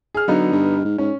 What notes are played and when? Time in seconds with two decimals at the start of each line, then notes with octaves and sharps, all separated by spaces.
0.15 G#4 F6
0.28 D3 F#3 B3 D#4
0.52 G2
0.85 G#2
0.98 G#2 C#4